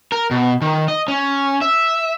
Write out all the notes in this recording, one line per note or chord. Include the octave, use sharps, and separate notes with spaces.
A#4
B2
D#3
D#5
C#4
E5